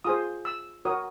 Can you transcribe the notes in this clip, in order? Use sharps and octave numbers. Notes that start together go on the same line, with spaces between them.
F4 G#4 C5 D#6
E6
F#4 A#4 C#5 D#6